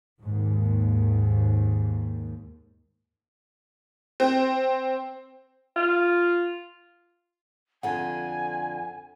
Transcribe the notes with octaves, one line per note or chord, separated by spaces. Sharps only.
D#2 G#2
C4
F4
F2 D3 F#5 G#5